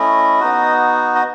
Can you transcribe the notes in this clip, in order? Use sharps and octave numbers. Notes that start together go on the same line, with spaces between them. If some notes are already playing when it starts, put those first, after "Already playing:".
Already playing: A3 C#4 E4 D#5
B3 D#4 F#4
D#5